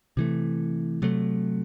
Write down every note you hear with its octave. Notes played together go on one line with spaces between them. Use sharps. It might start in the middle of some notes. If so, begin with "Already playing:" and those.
C3 E3 A3
C3 F#3 A3